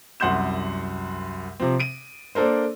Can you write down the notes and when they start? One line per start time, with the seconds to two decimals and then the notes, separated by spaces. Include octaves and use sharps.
0.20 C2 F#2 F#5 C6 G6 E7
1.60 C3 F3 C4
1.80 D7 D#7
2.35 A#3 D4 A4 A#4 C5